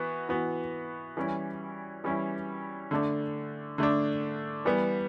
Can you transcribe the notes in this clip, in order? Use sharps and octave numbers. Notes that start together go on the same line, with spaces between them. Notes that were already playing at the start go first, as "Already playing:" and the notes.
Already playing: E3 B3 F#4
E3 B3 F#4
E3 G3 C#4 E4
E3 G3 C#4 E4
D3 A3 D4
D3 A3 D4
E3 G3 B3